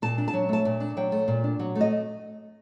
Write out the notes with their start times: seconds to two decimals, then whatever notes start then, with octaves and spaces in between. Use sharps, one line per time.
0.02 A#2 A5
0.18 D4
0.28 A5
0.34 F#3
0.49 A3 A5
0.65 A#2
0.80 D4
0.97 F#3 G5
1.12 A3
1.28 A#2
1.44 D4
1.59 F#3
1.75 A3
1.81 D#5